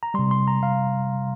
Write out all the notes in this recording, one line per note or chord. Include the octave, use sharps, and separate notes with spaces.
A#5
C3 G3 C6
C6
A#5
F5